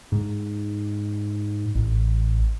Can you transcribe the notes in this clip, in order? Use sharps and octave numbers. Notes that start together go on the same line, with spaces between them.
G#2
A1